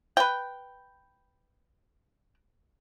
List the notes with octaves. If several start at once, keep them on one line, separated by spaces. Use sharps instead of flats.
B4 G5